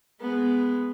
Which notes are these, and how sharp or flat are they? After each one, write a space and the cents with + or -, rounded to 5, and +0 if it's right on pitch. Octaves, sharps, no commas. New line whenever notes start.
G#3 +0 B3 +0